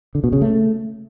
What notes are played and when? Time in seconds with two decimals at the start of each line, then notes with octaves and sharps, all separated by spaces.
0.15 D3
0.24 B2
0.33 C#3
0.41 A3